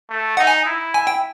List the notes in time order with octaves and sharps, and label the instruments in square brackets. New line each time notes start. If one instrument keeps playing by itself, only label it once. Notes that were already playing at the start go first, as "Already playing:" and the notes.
[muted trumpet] A3
[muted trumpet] D#4 [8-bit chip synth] F#5
[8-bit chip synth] G#5
[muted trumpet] E4
[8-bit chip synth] G#5
G5